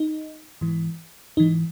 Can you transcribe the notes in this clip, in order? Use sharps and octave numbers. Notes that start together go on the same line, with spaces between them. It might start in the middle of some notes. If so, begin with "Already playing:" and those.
Already playing: D#4
G#2 E3
G#2 E3 D#4